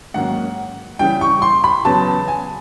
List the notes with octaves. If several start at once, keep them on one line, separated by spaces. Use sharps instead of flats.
G#2 D#3 F#3 A#3 C#4 F#5
C#3 E3 G3 G5
C#6
C6
B5
E2 C#3 F#3 B3 A5
G#5